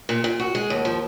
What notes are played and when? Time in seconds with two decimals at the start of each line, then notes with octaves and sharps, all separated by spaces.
0.09 A#2
0.24 A#2
0.40 F#4
0.55 G#3
0.70 D#2
0.85 F3